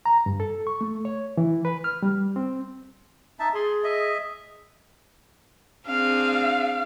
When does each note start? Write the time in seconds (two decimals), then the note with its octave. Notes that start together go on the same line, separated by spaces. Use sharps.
0.06 A#5
0.26 G2
0.40 A4
0.67 C#6
0.81 A3
1.05 C#5
1.37 E3
1.65 B4
1.84 F6
2.03 G3
2.36 C4
3.40 D#4 E5 A5
3.55 G#4 C6
3.84 D#5 E5
5.87 C4 D4 G#4 F5